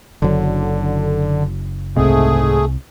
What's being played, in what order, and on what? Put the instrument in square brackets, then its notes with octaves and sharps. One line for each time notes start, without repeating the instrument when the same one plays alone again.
[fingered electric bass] F#1 F#3 [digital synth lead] D3
[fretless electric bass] C2 C3 [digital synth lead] G#2 [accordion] A3 G#4